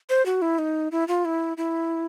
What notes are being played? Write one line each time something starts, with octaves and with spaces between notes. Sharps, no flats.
C5
F#4
E4
D#4
E4
F4
E4
E4